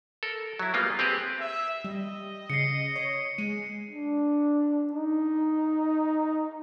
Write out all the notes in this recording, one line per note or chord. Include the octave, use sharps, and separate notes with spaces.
A4 A#4
F#3 E4
G3 G#3 A#3 B3 F4
C4 G4 G#4 B4
E5
G3 D#5
C#3 C7 C#7
C#5
G#3 D#7
D4
D#4